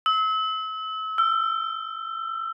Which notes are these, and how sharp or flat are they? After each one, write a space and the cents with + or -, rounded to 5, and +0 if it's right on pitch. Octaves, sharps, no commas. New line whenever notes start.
E6 -35
E6 +30